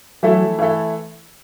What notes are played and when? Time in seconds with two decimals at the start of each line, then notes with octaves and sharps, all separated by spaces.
0.23 E3 F#3 A3 E4 A4
0.59 E3 A3 E4 A4